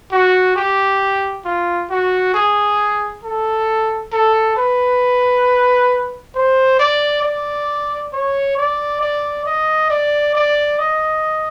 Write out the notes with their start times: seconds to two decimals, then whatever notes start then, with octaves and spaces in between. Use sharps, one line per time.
0.12 F#4
0.56 G4
1.45 F4
1.90 F#4
2.34 G#4
3.23 A4
4.12 A4
4.56 B4
6.35 C5
6.79 D5
7.23 D5
8.13 C#5
8.57 D5
9.01 D5
9.46 D#5
9.90 D5
10.35 D5
10.79 D#5